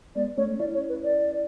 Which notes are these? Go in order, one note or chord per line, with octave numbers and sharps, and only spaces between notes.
G#3 B3 D5
A3 C#4 C#5
C#4 E4 D5
C#5
B4
D5